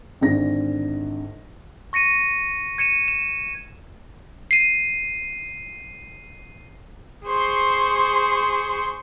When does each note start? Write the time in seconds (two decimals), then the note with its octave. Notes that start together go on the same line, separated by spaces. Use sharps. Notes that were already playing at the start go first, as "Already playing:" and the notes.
0.21 G#1 D3 A#6
1.93 C#6 A#6 C#7 D#7
2.78 G#6 C#7 D#7 E7
3.08 E7
4.51 C7 D#7
7.26 G#4 C5 C6 C#6